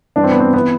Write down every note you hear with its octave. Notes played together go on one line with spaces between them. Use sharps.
G2 E3 D4
C4
B3
C4
E3 B3